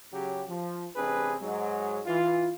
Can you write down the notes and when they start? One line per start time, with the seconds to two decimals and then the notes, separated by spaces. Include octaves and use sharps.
0.12 C#3 F#3 G4
0.48 F3
0.96 A1 C3 C4 D4 G#4 B4
1.41 G#2 F#3 G#3
2.06 E3 F4